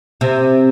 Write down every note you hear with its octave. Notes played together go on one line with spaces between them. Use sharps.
C3